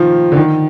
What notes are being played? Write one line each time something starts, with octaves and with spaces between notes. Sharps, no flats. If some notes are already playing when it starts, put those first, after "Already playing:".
Already playing: D#3 F3
D3
D#3